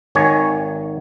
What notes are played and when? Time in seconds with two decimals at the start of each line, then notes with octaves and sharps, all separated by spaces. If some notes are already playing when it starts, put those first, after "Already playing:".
0.15 G#1 D#3 C#5 G#5